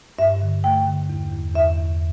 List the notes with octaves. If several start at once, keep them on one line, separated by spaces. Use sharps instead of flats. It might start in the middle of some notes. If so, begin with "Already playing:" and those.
G2 E5
D3
A3 G5
D3
E2
E2
E2 E5
E2